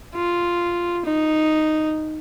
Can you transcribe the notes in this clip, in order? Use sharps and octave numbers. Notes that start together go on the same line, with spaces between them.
F4
D#4